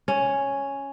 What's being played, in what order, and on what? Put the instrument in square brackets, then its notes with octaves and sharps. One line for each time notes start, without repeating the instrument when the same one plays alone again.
[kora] C#4